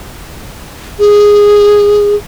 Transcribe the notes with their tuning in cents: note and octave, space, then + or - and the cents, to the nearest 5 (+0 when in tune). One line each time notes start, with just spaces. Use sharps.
G#4 -10